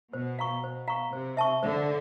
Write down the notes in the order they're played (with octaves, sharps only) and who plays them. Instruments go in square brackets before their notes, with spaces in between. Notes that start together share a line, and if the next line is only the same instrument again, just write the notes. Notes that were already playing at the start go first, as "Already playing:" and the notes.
[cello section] B2 [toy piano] C5
[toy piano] F5 A#5 C#6
[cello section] B2 [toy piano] C5
[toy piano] F5 A#5 C#6
[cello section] C3 [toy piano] C5
[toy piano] E5 A5 C#6
[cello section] D3 [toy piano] C5